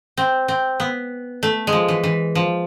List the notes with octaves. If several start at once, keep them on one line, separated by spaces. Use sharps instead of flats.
C4
C4
B3
A3
G#3
F3
E3
E3
F3